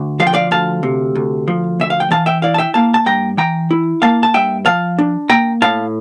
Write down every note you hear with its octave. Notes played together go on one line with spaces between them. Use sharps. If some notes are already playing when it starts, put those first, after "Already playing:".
Already playing: D2
F3 F5
G5
D5 F5
D2 F5 A5
C3
D2
F3
D2 E5
F5
G5
E3 F5 A5
E5 G5
E4 D5 F5
A5
E5 G5
A#3 F5 A5
A5
G2 G5 A#5
E3 G5 A#5
E4
A#3 F5 A5
A5
G2 E5 G5
F3 F5 A5
D4
A#3 G5 A#5
A2 F5 A5